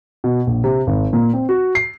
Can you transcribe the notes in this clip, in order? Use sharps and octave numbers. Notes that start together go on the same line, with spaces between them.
B2
A#1
C3
G#1
A#2
C4
F#4
C7